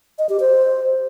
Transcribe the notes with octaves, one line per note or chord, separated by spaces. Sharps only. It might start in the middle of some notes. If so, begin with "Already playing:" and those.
D#5
G4
C5